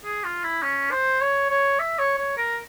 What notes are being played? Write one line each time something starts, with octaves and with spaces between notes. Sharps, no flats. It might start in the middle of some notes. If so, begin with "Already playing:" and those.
G#4
F4
E4
C#4
C5
C#5
C#5
E5
C#5
C#5
A#4